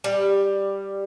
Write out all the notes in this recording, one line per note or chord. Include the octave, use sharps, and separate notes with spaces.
G3